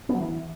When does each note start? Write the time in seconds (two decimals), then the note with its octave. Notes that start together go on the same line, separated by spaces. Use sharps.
0.09 B3
0.15 F#3
0.20 E3